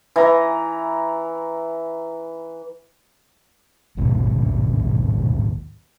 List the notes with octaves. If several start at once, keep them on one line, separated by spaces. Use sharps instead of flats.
E3 A#5
A1 D#2 G#2 B2